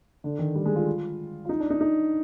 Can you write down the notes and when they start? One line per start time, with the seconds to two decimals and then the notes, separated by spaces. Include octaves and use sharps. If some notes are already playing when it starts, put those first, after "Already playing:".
0.24 D3
0.39 D#3
0.55 G3
0.66 G#3
0.76 F4
1.45 F4
1.49 D#4
1.60 D4
1.70 D#4
1.81 D#4